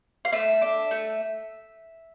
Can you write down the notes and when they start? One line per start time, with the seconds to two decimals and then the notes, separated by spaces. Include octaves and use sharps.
0.25 F5
0.33 A3 E5
0.61 D4 A4
0.91 A3